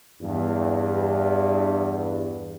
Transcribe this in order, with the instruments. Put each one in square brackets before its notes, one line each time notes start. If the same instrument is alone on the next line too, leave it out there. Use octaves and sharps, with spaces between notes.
[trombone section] E2 G2